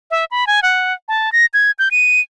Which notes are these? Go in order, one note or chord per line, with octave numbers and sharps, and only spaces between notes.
E5
B5
G#5
F#5
A5
A#6
G#6
G6
D#7